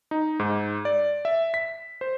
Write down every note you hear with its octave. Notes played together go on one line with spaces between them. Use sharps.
D#4
G#2
D5
E5
B6
C5